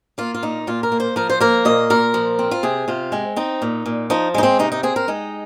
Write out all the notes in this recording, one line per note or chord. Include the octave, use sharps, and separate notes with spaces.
A#3 F4
F4
A#2 D#4
A#2 F4
A#4
A#3
C5
F3 A#4
C5
A#3 A#4
A#2 D#5
A#2 A#4
F3
C4
F4
C3 G#4
C3 F4
G#3 C4
C4 D#4
A#2
A#2
F3 D#4
G#3 D#4
C4
C3 D#4
D#4
C4 G#4
A#4
G#3 D#4